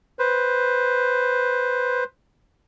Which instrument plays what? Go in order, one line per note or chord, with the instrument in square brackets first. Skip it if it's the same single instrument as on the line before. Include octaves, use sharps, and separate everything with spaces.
[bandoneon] B4 C5